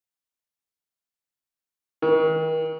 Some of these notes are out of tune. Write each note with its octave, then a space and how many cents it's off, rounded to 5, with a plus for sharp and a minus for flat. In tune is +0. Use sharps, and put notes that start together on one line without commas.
D#3 +40